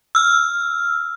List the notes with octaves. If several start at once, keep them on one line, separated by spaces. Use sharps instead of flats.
E6 F6